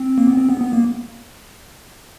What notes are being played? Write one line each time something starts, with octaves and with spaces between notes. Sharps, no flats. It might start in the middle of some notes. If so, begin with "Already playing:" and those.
Already playing: C4
A#3
B3
C4
B3
B3
A#3